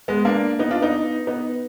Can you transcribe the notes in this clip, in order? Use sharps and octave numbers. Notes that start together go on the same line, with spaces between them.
G#3 B3
A#3 D4
B3 D#4
D4 F4
B3 D#4
B3 D#4